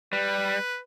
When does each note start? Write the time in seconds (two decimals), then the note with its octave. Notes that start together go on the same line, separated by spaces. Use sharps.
0.13 G3 B4